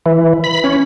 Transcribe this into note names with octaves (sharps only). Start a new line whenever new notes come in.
E3
B5
C#4